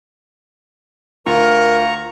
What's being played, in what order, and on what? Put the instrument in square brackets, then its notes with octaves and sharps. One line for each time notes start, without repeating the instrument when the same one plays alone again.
[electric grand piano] D2 [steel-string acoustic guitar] F4 [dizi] A#4 [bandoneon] A#5 C#6